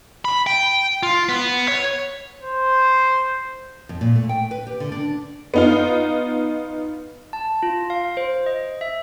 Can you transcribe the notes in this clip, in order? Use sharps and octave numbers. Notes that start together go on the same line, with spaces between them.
B5
G5
F4
B3
C#5
C5
F2
A#2
A3
G5
B4
G4
D3
D4
B3 D#4 F4
A5
F4
F5
C5
D#5
E5